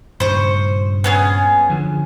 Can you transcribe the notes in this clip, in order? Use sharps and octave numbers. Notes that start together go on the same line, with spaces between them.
G2 A#2 C#3 C5 C#6
B3 C#4 G#4
D3 F3